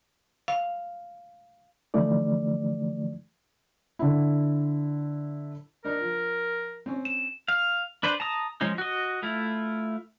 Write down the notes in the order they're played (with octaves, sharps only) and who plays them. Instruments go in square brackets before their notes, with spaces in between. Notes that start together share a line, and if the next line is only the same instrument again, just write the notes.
[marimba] F5
[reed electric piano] D3 E3 F3 A3 D#4 D5
[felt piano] D3 E4
[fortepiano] D4 D#4 [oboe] A#4
[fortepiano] F3
C4 C#4
[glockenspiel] E7
[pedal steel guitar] F5
D4 B4 C5 D5
A5 A#5 D#6
F3 G#3 C#4 D#4
F#4 D#5
A3 E4 F4